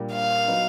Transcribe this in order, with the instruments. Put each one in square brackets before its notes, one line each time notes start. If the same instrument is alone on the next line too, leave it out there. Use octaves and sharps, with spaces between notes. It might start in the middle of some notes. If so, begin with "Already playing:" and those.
Already playing: [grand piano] A#2 G3 A#3 D4 G4
[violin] F5
[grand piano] F#3 B3 D#4